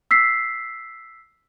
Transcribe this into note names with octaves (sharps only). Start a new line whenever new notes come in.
E6 B6 C7